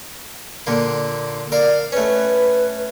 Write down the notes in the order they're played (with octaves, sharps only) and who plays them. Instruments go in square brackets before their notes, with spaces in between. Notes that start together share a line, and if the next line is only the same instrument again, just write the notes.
[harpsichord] A#2 D3 A#3
[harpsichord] A#4 F5 [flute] D5
[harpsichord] A3 C#4 [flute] B4